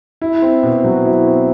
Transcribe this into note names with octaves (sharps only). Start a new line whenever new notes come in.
E4
C4
B2
F#3
E4
C4